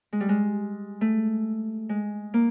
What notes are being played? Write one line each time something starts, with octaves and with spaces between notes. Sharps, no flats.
G#3
G3
G#3
A3
G#3
A#3